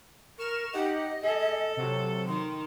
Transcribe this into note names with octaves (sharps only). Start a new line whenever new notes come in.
A#4 C#6 F6 E7
D#4 G4 D#5 F#5
G#4 A4
C3 F#3
D#3 C6